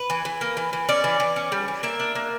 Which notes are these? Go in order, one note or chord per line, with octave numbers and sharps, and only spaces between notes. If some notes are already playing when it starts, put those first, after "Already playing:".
Already playing: B4
E3
E3
A#3
E3
E3
C#4 D5
E3
E3
C#4
G3
E3
A#3 E5
D4
A#3